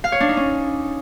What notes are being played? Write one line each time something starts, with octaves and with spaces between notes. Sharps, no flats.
F5
C#5
D4
D#4
C#4